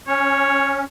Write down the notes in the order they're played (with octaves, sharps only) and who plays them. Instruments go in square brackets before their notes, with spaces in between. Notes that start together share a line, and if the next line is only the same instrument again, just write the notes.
[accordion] C#4 [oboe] C#5